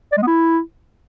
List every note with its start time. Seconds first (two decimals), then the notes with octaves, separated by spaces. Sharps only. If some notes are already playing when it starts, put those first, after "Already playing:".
0.12 D5
0.17 G#3
0.22 B3
0.27 E4